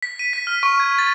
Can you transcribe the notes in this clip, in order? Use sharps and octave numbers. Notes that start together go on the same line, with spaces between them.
B6
D#7
B6
F6
C#6
G#6
A6